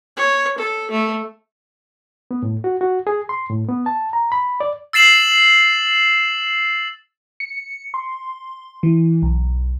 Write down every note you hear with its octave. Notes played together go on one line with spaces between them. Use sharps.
C#5
A4
A3
B3
A2
F#4
F#4
G#4
C6
A2
B3
A5
A#5
B5
D5
E6 A6 C7 E7 F#7
C#7
C6
E3
B1